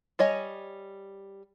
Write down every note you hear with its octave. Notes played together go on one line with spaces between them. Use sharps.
G3 C#5 D#5 G#5